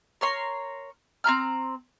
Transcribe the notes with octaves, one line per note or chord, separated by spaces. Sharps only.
A#4 C#5 C6
C4 E4 A#5 F6